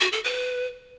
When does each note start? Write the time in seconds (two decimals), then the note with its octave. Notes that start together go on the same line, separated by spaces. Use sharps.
0.01 F#4
0.13 A4
0.24 B4